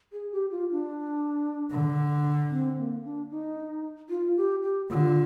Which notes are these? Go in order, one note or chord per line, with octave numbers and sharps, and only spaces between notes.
G#4
G4
F4
D4
D3
C4
A#3
D4
D#4
F4
G4
G4
D3 F4